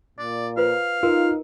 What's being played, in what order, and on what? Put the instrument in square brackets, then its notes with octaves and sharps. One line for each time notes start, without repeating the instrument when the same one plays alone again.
[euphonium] A#2 [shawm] D5
[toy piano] F4 B4 C5 [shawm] F5
[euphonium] D#4 [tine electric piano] F4 [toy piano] A#4